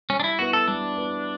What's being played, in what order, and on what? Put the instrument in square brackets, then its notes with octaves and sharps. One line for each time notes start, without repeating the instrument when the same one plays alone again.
[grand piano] G3 [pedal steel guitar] C#4
[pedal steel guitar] D4
E4
[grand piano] B3 E4 B4 [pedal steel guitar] F#4
[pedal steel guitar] A4
[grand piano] G3 [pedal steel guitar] D4
[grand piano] B3 E4 B4